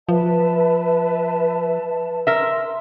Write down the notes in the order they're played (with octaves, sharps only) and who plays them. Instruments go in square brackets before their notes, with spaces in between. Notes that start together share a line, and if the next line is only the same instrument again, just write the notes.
[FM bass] F3 [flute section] B4 E5 A5
[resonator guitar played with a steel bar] A#4 E5 [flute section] C6